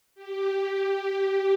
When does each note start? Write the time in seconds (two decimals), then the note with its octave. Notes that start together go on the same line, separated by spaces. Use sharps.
0.15 G4